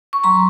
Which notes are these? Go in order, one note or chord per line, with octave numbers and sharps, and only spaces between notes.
C#6
F#3 A#5 C6